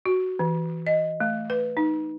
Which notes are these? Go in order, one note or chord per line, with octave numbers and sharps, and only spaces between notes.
F#4
E3
D#5
A3
B4
D#4